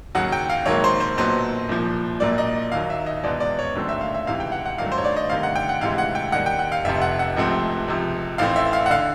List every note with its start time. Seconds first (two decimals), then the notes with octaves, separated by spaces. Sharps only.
0.15 D#2 C#3 F#3 F#5
0.32 G5
0.50 F5
0.66 A#1 G#2 D#3 F#3 A#3 C#5
0.84 C5
1.00 C5
1.17 B1 A#2 F#3 B3 C5
1.69 C2 A#2 F3
2.20 A#1 A#2 F#3 A#3 D5
2.38 D#5
2.72 D#2 D#3 F#3 F5
2.90 E5
3.06 D#5
3.24 E2 B2 G#3 B3 D5
3.40 D5
3.59 C#5
3.75 D#2 D3 F#3 A3 C4
3.89 E5
4.01 F5
4.14 E5
4.27 C#2 C3 E3 F5
4.40 G5
4.52 F#5
4.66 F#5
4.78 G2 D#3 F#3 A3 F5
4.92 C5
4.98 C#5
5.05 D5
5.16 D#5
5.30 D2 C3 D#3 F5
5.43 F#5
5.56 G5
5.69 F#5
5.81 D2 C3 E3 G#3 F5
5.98 F#5
6.15 G5
6.32 D#2 D#3 G3 F#5
6.46 G5
6.59 F#5
6.72 F5
6.84 F1 F2 C3 E5
7.02 F#5
7.19 F#5
7.36 C#2 C3 F3 A3 C4
7.88 C#2 C3 F3
8.38 A1 A2 E3 A3 C4 F5
8.56 E5
8.73 F5
8.86 F#5
8.91 D3 F5